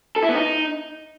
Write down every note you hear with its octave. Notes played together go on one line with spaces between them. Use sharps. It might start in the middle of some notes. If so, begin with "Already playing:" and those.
A4
E4
B3
D#4